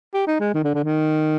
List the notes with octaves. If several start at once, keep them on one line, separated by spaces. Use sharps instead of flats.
G4
D#4
G#3
D#3
D3
D3
D#3